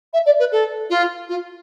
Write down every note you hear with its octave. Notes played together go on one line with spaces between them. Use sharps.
E5
D5
B4
A4
F4
F4